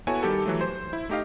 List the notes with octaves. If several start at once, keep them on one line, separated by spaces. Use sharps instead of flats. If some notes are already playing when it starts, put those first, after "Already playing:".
B3 E4 F#4 A4 C#5 G#5
D#3 G3 G4 A4
E3 F#3 A3
C5
E4
A3 D#4 G4 D#5 F5